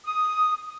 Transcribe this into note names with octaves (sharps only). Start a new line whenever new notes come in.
D#6